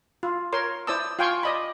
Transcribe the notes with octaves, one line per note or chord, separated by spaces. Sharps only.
F4
A#4 C#5 C6
E4 C5 D5 A5 D#6 E6
F4 F5 G5 G#5 C6 C#6
D5 D#5 B5